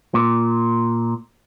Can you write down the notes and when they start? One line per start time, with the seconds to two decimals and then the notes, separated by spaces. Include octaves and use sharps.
0.14 A#2